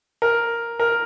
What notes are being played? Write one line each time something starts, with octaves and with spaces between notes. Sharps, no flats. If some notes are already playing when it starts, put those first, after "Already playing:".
A#4
A#4